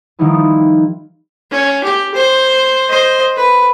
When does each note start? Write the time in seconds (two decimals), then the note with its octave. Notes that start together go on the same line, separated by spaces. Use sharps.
0.19 D#3 F3 G3 D#4 E4 B4
1.51 C#4
1.84 G4
2.14 C5
2.89 C5 D#5
3.37 B4